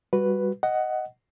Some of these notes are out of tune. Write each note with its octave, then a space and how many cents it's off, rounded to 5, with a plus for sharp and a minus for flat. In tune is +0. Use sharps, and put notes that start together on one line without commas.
G3 +5 F#4 +0 B4 +0
D#5 +0 F#5 +10